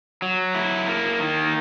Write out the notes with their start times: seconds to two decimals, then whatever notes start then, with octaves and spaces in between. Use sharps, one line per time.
0.22 F#3
0.55 E4
0.87 A#3
1.20 D#3